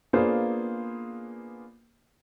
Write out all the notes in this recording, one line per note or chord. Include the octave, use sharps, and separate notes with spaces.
A#3 B3 D4 F4 G#4 C5